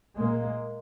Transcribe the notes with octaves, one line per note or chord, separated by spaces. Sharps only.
A#2 G#3 A#3